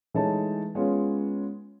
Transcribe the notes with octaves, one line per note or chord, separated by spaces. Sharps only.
E3 G#3 A3 D#4 C#5 A5
G#3 B3 C#4 F4 C#5